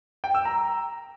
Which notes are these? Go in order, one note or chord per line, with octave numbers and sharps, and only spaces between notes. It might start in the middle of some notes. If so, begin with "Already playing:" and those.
G5
E6
A#5